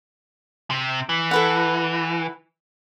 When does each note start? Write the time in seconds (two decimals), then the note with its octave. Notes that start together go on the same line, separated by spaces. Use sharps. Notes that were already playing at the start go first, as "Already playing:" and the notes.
0.70 C3
1.09 E3
1.31 A4 B4 F#5